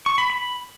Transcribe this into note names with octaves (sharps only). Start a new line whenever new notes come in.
C#6
B5
B5